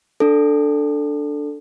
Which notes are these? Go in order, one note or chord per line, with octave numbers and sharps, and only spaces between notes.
D4 A4